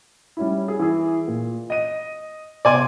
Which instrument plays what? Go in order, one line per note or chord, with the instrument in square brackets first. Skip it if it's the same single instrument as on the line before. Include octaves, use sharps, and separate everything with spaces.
[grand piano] G3 C#4 E4
G#4
E3 G#4
A#2
D#5 D#7
[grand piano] C3 B3 D6 [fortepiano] D5 G#5 C6